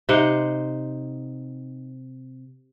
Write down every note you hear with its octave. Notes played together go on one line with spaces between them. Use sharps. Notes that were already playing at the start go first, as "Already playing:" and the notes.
C3 D#4 C5 F#5